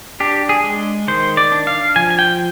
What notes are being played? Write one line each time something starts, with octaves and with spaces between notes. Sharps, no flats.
D4 G4
G#4
G#3
D#3 C5
D5
D4
F5
F3 G#5
G#5
G5